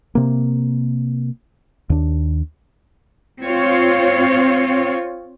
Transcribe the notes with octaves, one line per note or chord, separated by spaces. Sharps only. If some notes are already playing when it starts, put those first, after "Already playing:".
C3 A#3
D#2 D4
C4 F4 C#5